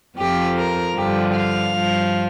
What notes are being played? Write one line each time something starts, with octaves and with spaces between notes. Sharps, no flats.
F2 F3 G4
A#4
G2 D3 F3 G4
F5
G2 F3